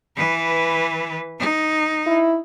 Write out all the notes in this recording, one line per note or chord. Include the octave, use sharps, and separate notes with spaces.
E3 B4
D#4
E4